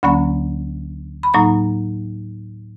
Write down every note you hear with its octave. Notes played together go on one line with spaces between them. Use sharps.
D2 D3 F#3 A#3 C#4 B5
B5
A2 F#3 A#3 D#4 A#5